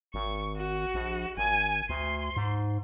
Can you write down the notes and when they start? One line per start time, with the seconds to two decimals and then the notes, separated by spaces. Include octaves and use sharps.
0.14 G#1 C#6
0.56 F#4
0.94 A#1
1.37 G#1 G#5
1.89 D2 C6
2.36 G#2